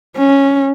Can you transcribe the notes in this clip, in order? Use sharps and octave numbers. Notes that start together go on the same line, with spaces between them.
C#4